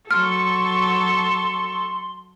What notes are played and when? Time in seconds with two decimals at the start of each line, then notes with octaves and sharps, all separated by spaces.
0.11 F#3 A4 C6 C#6 F6